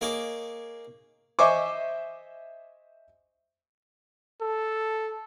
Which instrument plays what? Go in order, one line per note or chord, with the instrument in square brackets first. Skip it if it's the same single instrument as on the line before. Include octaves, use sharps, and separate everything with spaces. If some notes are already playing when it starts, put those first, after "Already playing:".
[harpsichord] A#3 D#4 G#4 C#5 D6
[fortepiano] C5 D#5 E5 G#5 C#6 D6
[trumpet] A4